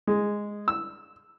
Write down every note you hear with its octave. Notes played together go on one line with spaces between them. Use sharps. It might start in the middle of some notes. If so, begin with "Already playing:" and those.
G#3
E6